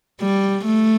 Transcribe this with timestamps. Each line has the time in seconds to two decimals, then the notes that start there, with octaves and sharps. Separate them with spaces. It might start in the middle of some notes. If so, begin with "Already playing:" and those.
0.21 G3
0.65 A3